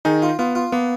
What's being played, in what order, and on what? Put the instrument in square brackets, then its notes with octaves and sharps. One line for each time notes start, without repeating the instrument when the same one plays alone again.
[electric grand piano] D#3 D#4 [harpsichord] G#4
[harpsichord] F4
[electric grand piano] B3 [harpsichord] F4
[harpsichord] F4
[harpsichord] A#3 [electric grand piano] B3